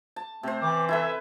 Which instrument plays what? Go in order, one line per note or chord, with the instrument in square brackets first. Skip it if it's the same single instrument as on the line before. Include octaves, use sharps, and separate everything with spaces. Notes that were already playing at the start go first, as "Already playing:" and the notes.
[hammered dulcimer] A5
[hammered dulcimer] C3 C5 [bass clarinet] A3
[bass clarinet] E3 [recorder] D6
[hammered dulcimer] E4 A4 B4 [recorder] E5